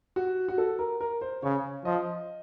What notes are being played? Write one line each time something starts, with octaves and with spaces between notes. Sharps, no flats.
F#4
F#4
A4
A#4
A#4
C5
C#3 C#5
F3 D#5